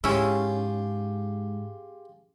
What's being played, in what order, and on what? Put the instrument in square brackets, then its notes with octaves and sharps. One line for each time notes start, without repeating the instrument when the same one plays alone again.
[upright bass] G#2 [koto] C#4 E4 [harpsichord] F4 G4 G#4